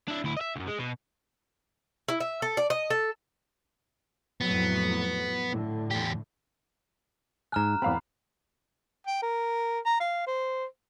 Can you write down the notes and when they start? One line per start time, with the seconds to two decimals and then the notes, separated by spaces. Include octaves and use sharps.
0.08 D4 E4
0.24 D2 E4
0.37 D#5 E5
0.56 C#2 F#2
0.67 G#3
0.79 B2
2.09 E4
2.20 E5
2.42 A4
2.57 D5
2.70 D#5
2.90 A4
4.41 F2 A2 F#3 B3
5.48 A2 D3
5.91 E2 G4
7.52 G#2 G#5 A#5 F6 F#6
7.82 E2 C4 F5 B5
9.07 G5
9.22 A#4
9.86 A#5
10.00 F5
10.27 C5